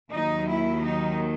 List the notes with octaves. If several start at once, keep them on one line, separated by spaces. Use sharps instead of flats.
D#2 D#3 F#3 D#4
E4
D#4